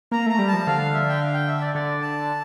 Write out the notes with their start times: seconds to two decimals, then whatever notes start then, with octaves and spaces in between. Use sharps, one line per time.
0.12 A#3 A#5
0.26 A3 A#5
0.39 G3
0.48 A5
0.53 F3
0.67 D3 F5
0.94 E5
1.09 G5
1.21 F5
1.34 G5
1.48 E5
1.61 D5
1.75 D3 D5
2.02 A5